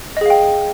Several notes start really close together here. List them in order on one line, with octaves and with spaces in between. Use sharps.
D#5 G#4 F5 G5